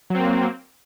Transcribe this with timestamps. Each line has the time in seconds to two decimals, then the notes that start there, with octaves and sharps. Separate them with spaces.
0.10 F#3
0.15 C4
0.19 A#3